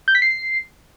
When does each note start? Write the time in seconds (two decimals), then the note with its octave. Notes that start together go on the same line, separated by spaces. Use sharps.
0.08 G6
0.15 B6
0.22 C7